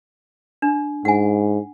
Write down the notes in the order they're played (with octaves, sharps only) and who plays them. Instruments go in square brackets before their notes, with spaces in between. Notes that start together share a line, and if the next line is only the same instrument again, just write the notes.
[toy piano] D4
[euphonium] G#2 [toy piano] F#5 G#5